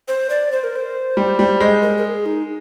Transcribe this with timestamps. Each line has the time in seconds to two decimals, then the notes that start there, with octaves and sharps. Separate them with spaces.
0.08 C5
0.30 D5
0.52 C5
0.64 A#4
0.76 C5
1.17 G3
1.39 G3
1.60 G#3
1.82 A#4
1.98 A#4
2.04 G#4
2.26 D#4